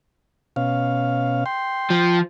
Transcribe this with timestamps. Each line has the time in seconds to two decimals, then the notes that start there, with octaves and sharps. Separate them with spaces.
0.56 B2 C#4 F5
1.46 G5 C6
1.91 F3